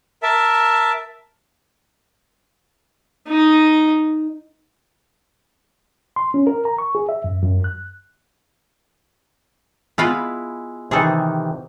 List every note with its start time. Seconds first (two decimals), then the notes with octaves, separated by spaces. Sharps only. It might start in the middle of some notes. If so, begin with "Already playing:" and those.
0.23 A#4 E5 A5
3.28 D#4 D#5
6.16 C6
6.34 C#4
6.47 A#4
6.65 A#5
6.78 C#6
6.95 G#4
7.09 E5
7.24 F#2
7.42 F#2
7.64 F#6
9.98 G#3 B3 E4 F4 B4
10.91 C3 D#3 E3 G#4 A4